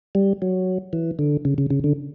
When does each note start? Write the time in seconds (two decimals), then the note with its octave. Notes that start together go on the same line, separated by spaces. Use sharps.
0.15 G3
0.42 F#3
0.93 E3
1.19 D3
1.45 C#3
1.58 C#3
1.70 C#3
1.84 D3